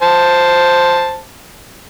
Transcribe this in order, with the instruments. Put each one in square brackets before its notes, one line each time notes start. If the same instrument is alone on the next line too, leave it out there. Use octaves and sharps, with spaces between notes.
[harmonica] C5 A5